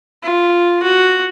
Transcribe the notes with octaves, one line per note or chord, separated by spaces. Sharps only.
F4
F#4